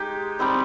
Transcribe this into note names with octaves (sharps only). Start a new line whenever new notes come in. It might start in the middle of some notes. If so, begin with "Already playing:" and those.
Already playing: G#3 D#4 G4
G3 C4 D#4